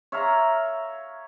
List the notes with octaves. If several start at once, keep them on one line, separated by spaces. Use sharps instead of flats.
C#5 E5 F5 A#5